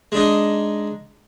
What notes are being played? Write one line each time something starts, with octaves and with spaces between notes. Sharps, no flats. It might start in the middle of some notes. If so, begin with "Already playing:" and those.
G#3 D4 D#4